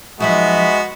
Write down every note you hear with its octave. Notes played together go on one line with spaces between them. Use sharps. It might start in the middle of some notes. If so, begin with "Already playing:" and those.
F3 F#3 G#3 B3 D#4 F#4 E5